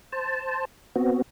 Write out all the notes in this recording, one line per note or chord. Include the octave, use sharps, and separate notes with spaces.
C5 A5
B3 C4 F#4